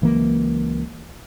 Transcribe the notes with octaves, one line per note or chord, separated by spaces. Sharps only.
C#2 E3 F#3 A#3